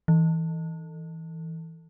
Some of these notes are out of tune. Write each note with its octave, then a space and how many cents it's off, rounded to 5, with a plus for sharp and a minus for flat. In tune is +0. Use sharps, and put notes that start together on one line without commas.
E3 -20